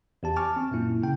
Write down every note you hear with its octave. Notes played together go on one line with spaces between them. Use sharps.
E2 G4 A5
G#5 A5 C#6 D6 F6
C4
F#2 A#2 A#3 E4
C#3 G5